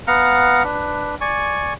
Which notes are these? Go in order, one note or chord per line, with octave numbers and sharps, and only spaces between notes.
B3 F5 F#5 A#5
D4 B4
D5 G#5 C#6